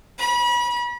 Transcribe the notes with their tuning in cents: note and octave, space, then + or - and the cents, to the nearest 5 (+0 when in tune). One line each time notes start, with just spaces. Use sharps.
B5 -35